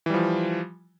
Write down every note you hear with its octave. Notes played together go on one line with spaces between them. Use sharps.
E3 F3 G3